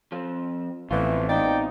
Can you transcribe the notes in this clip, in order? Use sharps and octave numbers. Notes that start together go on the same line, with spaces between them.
F3 C4
A1 B2 E3 F3 A3 C4 F4
D#4 D5 G5